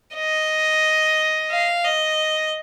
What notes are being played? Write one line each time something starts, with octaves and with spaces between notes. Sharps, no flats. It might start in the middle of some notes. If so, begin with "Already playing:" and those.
D#5
F5
D#5